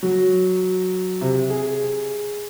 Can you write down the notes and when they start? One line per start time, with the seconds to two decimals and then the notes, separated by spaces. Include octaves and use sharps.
0.03 F#3
1.21 C3
1.50 G#4